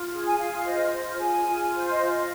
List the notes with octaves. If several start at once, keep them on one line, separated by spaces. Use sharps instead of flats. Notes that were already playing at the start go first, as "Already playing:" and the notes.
Already playing: F4
G#4
G#5
F4 F5
F5
C5 D#5
F4
G#4 G#5
F4
C5
D#5
F4
D#5